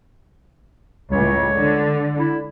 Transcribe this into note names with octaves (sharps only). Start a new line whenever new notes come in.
C#2 A2 C#5
D3
E4